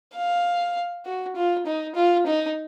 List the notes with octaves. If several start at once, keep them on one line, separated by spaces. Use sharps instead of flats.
F5
F#4
F4
D#4
F4
D#4